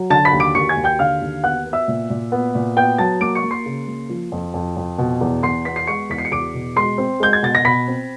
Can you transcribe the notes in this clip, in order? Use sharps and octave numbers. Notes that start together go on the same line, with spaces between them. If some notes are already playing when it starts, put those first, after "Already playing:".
Already playing: F#3
D3 A5 A6
B5 B6
D#2
D6 D7
D#2 C#6 C#7
G#5 G#6
D#2
G5 G6
D3 F5 F6
D#2
B3 F#5 F#6
B3
E5 E6
A#2
A#2
B3
A#2
B3 G5 G6
F#3 A5 A6
A#3 D6 D7
C#6 C#7
A#3
C6 C7
C#3
A#3
F3
F2
F2
F2
B2
E2
E2 C6 C7
B3 B6
C7
G#3 C#6 C#7
E2 B6
C7
C#7
E2 D6 D7
B2
G#3 C6 C7
C4
G#3 G6
G#6
B2 A6
A#6
B2 B5 B6
C4